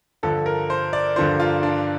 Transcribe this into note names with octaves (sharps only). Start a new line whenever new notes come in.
G2 D3 F3 A4
A#4
C5
D5
G2 D3 F3 C5
F4
D4